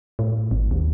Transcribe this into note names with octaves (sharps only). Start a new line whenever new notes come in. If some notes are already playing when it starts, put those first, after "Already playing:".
A2
G#1
D#2